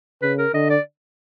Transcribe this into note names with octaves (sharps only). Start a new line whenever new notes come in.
C#3 B4
A#4
D3 D#5
D5